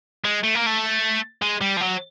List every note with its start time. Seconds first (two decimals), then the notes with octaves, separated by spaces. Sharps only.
0.24 G#3
0.44 A3
0.55 A#3
0.66 A3
1.42 G#3
1.61 G3
1.77 F3
1.81 F#3